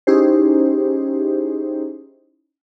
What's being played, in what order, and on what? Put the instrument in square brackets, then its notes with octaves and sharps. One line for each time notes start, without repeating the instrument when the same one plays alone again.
[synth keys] C#4 D#4 E4 G4 G#4 C5